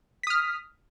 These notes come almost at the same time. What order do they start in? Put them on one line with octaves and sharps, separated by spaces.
B6 D#6 F6